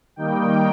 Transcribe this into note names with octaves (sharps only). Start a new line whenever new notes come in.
D#3 G3 A#3 D#4 G5